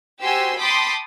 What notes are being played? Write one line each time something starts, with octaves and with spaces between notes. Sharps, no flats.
F#4 G4 C5 G#5 C6 E6
G5 A5 B5 C6 D6 D#6